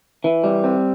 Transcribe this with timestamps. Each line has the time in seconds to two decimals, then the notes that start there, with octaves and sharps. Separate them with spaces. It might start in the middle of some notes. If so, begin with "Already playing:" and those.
0.24 E3
0.44 G3
0.64 C4